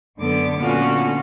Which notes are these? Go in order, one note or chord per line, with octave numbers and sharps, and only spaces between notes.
F#2 D3 B3 D6
A#2 D3 B3 C#4 F4 F#4